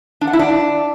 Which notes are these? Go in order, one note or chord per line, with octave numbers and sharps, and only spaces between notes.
D4
F#5
E4
D4